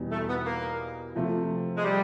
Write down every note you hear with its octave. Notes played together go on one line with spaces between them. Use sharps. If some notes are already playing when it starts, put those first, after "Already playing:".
Already playing: E2 B2 G3 B3 D#4
A3
B3
A#3
C3 F3 A3
G#3
G3